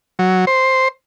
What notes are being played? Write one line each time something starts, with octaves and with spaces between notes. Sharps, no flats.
F#3
C5